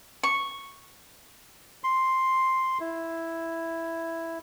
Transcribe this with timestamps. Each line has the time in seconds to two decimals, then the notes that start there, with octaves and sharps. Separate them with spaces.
0.23 C#6
1.84 C6
2.80 E4